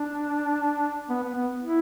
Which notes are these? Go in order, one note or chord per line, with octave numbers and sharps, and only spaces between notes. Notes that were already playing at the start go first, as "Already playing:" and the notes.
Already playing: D4
B3
B3
B3
E4